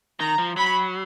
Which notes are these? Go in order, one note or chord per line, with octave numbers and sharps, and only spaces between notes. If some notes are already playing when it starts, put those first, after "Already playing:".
D#3 A#5
F3
F#3 B5